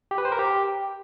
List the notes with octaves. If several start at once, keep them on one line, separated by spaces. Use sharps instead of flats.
G4
B4
C5
A#4
G4